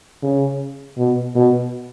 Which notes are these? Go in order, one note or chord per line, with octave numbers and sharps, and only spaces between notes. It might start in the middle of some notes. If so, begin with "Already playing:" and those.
C#3
B2
B2